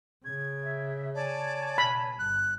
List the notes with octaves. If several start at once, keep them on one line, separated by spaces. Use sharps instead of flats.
C#3 G#6
E5
C#5 D5 G#5 A5
B2 B5
G1 F#6